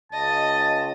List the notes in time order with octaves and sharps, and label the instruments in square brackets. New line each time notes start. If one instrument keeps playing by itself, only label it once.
[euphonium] C#2 [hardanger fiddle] D#5 [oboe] A5